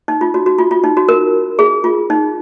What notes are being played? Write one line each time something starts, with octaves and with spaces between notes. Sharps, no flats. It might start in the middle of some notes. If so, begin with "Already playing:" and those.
D#4
F4
F#4
F#4
F4
F4
D#4
F#4
A#4
G#4
F4
D#4